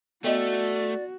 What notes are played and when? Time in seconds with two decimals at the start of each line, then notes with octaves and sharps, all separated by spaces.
0.24 A3 B3 F#4 D5 D#5